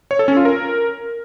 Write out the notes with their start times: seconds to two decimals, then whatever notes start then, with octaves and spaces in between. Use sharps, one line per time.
0.11 C#5
0.19 A4
0.28 C#4
0.37 F4
0.45 A#4